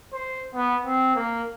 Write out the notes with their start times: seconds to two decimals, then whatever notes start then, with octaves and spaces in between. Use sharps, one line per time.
0.13 C5
0.55 B3
0.85 C4
1.16 A#3